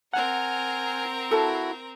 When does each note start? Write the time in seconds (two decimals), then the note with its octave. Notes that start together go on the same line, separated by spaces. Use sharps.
0.14 C4 A#4 F#5 G#5 A#5 F6
1.31 E4 F#4 A4 A5